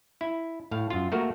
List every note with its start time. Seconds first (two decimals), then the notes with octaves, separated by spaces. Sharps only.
0.21 E4
0.71 A2 F5
0.90 F#2 F4
1.12 A3 A#3 F#4 A#4